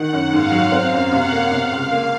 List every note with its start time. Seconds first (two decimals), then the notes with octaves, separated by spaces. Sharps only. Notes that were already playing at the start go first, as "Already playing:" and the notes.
Already playing: D#3 F#5
0.13 F#2
0.33 G#2 F5
0.52 F#3
0.72 C4
0.92 F#2
1.12 C3 F#5
1.32 A#3
1.51 C3 F5
1.71 C#2
1.92 A#3